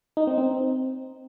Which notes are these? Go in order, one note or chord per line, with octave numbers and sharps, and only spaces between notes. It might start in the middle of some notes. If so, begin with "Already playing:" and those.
D#4
C4
C4